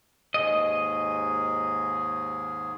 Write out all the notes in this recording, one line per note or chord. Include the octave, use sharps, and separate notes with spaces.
D#2 G#2 G#4 D#5